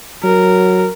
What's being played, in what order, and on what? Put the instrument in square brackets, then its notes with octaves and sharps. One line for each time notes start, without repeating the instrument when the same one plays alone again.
[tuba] F#3 [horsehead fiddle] A#4